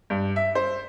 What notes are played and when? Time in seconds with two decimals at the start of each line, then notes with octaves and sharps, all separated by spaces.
0.10 G2
0.36 E5
0.55 C5